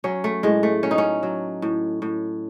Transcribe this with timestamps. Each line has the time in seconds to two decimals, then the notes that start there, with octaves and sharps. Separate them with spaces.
0.04 F#3 C#4
0.24 A3
0.43 A2 G#3
0.63 A3
0.83 F#3 C#4
0.91 D#4
0.98 C#4
1.23 F#3
1.62 A2
2.02 A2